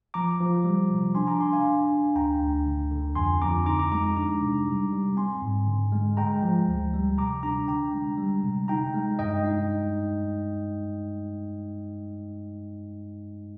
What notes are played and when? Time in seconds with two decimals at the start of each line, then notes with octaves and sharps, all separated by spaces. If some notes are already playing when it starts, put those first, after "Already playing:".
0.14 F3 A#5 D6
0.40 F3
0.64 G3
0.90 C3
1.15 D4 G#5 C6
1.27 A#5 D6
1.40 D4 G#5 C6
1.53 F5 G#5
1.65 D4
1.91 D4
2.15 D2 G5 A#5
2.41 D2
2.66 D3
2.91 D3
3.16 F2 G#5 C6
3.41 F2 A#5 D6
3.66 D#4 A#5 D6
3.79 A#5 D6
3.92 G#3 A#5 D6
4.04 A#5 D6
4.16 D4 A#5 D6
4.42 C3
4.67 G3
4.92 G3
5.16 C4 G#5 C6
5.42 G#2
5.67 D3
5.92 G#3
6.17 G#3 G5 A#5
6.43 F3
6.68 D2
6.93 G3
7.18 C3 A#5 D6
7.43 D4 A#5 D6
7.68 D3 G5 A#5
7.93 G#3
8.18 G3
8.43 C3
8.68 D#4 G5 A#5
8.94 G#3
9.19 G2 D#5 G5
9.44 D#4